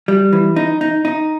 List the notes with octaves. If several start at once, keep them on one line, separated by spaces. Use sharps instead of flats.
G3
E3
D#4
D#4
D#4